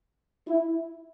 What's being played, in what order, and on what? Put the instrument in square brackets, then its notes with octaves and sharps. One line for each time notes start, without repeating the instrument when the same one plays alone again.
[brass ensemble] E4